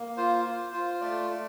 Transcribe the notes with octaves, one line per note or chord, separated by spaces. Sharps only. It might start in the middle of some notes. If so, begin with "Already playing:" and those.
Already playing: A#3
F4 C5
F4
F4
A3 D5
A3